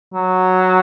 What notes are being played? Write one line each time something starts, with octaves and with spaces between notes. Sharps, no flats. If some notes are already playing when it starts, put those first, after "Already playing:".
F#3